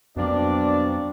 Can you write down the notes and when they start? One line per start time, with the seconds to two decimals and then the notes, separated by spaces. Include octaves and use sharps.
0.16 F2 B2 F#3 A#3 C4 D4 D5